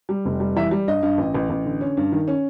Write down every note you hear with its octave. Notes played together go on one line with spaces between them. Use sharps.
G3
F1
G3
E3 E5
G3
G2 D#5
G2
A1
A1
A1
D3
C#4
G2
D#3
C#4